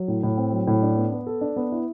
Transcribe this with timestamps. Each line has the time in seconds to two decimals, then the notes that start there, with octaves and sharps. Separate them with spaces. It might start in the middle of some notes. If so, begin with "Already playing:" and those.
Already playing: F#3
0.08 A2
0.23 A2
0.37 C4
0.52 F#3
0.67 A2
0.82 D4
0.97 B3
1.12 B3
1.27 A4
1.41 D4
1.56 B3
1.72 E4